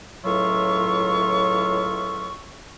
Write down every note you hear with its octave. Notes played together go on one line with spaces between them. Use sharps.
C#2 A2 F#3 F4 E5 C#6